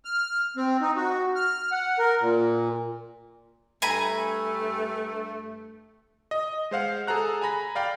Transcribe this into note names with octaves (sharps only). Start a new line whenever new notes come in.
F6
C4
D#4
F#4
F6
F#5
A#4
A#2
G2 A3 G#5 A#5 B5
D#5
G#3 C5 F5 F#5
G#4 A4 F#5 A#5 F#6
G#5 A#5 B5 A#6
D5 F5 G5 B5